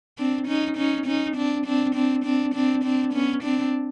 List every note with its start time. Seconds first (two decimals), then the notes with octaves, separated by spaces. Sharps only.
0.18 C4 D4
0.47 C#4 D#4
0.77 C#4 D#4
1.06 C#4 D#4
1.36 C4 D4
1.66 C4 D4
1.95 C4 D4
2.25 C4 D4
2.54 C4 D4
2.84 C4 D4
3.13 B3 C#4
3.43 C4 D4